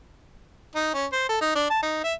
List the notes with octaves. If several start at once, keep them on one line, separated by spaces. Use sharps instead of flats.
D#4
C#4
C5
A4
D#4
D4
A5
D#4
E5